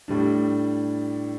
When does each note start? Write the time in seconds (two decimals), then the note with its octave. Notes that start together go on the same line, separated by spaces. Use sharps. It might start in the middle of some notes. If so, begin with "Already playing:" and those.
0.08 A2 G3 D4